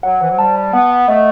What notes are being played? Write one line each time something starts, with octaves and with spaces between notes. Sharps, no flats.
F#3 F#5
E3 C5
F#3
G3 A5
A5
B3 F#5
F#5
A3 D#5